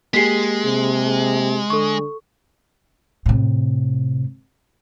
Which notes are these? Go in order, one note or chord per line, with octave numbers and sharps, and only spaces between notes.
G#3 A#3 G4 G#4 B6 C7
C3
D3 A4 C#6
A2 C3